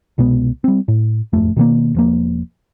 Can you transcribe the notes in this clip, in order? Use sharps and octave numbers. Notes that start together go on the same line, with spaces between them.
C2 B2 G#3 B3
G3 C4
A2
D#1 G#1 F2 A3
B2 D#3 G3 A#3
E1 F3 A#3